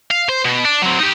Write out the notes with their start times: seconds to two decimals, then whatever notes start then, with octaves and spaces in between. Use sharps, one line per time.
0.11 F5
0.29 C5
0.45 B2
0.65 D4
0.82 F#3 C4
0.99 D#4 G4